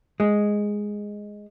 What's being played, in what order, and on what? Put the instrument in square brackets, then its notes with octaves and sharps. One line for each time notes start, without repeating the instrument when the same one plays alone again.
[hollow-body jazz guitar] G#3